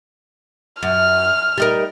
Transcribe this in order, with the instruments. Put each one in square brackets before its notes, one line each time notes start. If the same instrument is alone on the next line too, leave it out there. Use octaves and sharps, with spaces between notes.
[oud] F#2 [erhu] F6
[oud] G3 D#4 A#4